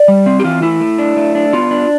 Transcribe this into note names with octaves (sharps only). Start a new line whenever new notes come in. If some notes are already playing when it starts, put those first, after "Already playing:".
Already playing: D5
G3
C4
G4
E3 F4
A3 E4
A3
D4
A3
D4
B3 F4
D4